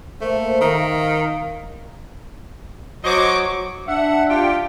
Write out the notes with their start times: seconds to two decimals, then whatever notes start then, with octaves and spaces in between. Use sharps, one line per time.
0.21 A3 A#3 C5
0.61 D#3 F5 A#5
3.05 F#3 C5 D#5 C#6 D6
3.88 D4 E5 F#5
4.29 F4 G4 G5